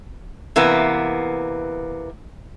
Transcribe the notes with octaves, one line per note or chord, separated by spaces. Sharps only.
C3 E3 A#3 B3